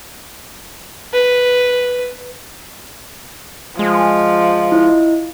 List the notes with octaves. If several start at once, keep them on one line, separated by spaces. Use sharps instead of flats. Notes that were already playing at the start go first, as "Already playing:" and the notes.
B4
F3 G#3
E4 D#5